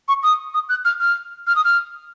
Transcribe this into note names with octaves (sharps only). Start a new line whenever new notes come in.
C#6
D#6
D#6
F#6
F6
F6
F6
D#6
F6